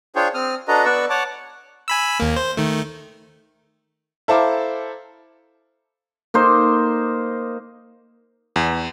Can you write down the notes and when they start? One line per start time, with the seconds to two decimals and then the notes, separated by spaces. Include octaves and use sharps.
0.16 D4 F4 G#4 C5 C#5 G5
0.34 C4 D#6 F6
0.68 D4 F#4 A4 B4 D#5 A#5
0.85 B3 B4 D5 C#6 E6
1.10 C#5 F#5 A5 D6
1.88 G#5 B5 E6
2.20 D#2 A#3
2.36 C5
2.57 D#3 A3
4.28 E4 A4 C5 F5 A#5 D6
6.34 A#3 D#4 C5
8.56 E2